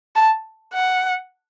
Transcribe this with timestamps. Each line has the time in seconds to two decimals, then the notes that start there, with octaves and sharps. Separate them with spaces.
0.16 A5
0.74 F#5